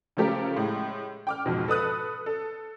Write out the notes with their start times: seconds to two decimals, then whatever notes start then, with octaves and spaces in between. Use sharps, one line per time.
0.17 C#3 F3 A3 G4 A#4
0.56 A2 G#3
1.27 G5 D6 F6
1.46 F2 G#2 B2
1.68 A4 B4 D#6 F#6
2.26 A4